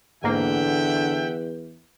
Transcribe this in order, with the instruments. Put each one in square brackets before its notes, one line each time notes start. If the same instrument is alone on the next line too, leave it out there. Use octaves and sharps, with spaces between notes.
[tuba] E2 [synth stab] G#2 A#3 [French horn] D3 [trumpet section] E5 F#5 G5